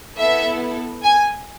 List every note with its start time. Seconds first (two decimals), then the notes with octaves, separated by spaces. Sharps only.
0.17 B3 E4 A4 E5
1.03 G#5